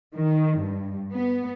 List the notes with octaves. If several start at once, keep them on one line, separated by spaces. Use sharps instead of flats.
D#3
G2
B3